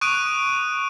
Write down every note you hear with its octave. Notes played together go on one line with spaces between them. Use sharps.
C#6 D#6 F#6 D7 D#7